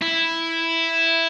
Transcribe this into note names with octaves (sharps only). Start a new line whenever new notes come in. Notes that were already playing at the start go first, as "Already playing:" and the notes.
E4